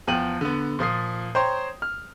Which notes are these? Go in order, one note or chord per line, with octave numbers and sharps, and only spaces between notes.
E2 F3 G5 D#7 F#7
D3 B3
A#2 F3 D#6 C7
C5 C#5 G5 A#5 C6
F6